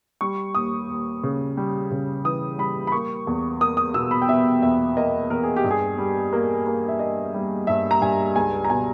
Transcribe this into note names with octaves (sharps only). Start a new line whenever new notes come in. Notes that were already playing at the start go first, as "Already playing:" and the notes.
G3 C#6
D#2 D#6
D#2
C#3
G3
C#3
E3 D#6
G3 B5
B5
A#3 C#6
E2
A#3 D#6
D#6
B2 E6
B5
G5
B2 E5
E2 E5
A#3 D#5
E2 A#4
G#4
G4
G2
G#4
G3
A#3
A#3
E5
A#3 D#5
G3
G2 E5
A#5
G2 G#5
C#2 G#5
A#5
B2 G#5